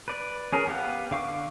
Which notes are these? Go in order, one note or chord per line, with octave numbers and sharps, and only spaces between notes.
B4 D5
C#4 G#4 A#4
B3 G4 F5 F#5
D3 F5 C#6 D6